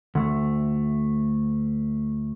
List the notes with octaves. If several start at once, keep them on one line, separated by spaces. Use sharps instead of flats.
D2 A3